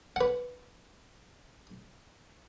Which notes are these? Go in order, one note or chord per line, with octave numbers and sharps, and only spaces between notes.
B4 F#5